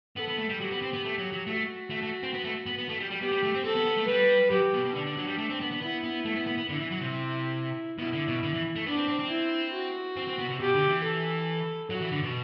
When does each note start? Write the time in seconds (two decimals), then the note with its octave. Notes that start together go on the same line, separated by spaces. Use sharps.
0.17 B3 A4
0.28 B3
0.38 A3
0.49 G3
0.60 F#3 G4
0.71 B3
0.82 C4
0.93 B3
1.04 A3
1.18 F#3
1.32 F#3
1.47 A3 F#4
1.90 A3
2.02 A3
2.23 C4
2.34 B3
2.44 A3
2.66 B3
2.78 B3
2.89 A3
3.00 G3
3.10 G3
3.21 B3 G4
3.31 G3
3.43 A3
3.54 C4
3.65 C4 A4
3.76 B3
3.86 B3
3.98 A3
4.08 G3 B4
4.51 F#3 G4
4.74 B2
4.85 B2
4.95 D3 D4
5.06 D3
5.17 F#3
5.27 G3
5.38 A3
5.50 C4
5.61 B3
5.71 B3
5.81 B3 E4
6.03 B3
6.25 A3
6.36 B3
6.47 B3
6.58 B3
6.69 D3 E4
6.79 E3
6.91 F#3
7.01 C3
7.13 E4
7.99 B2 E4
8.13 D3
8.28 B2
8.43 D3
8.54 E3
8.76 A3
8.86 B3 D4
8.97 C4
9.08 C4
9.19 C4
9.30 E4
9.73 F#4
10.16 C4
10.27 C4
10.38 B3
10.44 B2
10.49 C3
10.60 B2 G4
10.74 D3
10.88 E3
11.03 A4
11.90 F#3 F#4
12.01 E3
12.12 D3
12.23 B2